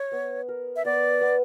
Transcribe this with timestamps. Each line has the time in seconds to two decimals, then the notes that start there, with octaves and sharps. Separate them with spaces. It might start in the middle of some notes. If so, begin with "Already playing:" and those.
Already playing: C#5
0.12 B3
0.49 A#4
0.76 E5
0.85 B3 D5
1.21 B3